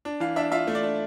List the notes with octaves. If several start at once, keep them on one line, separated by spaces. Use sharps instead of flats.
D4
E3 F5
D4 E5
F4 E5
A3
D5
D4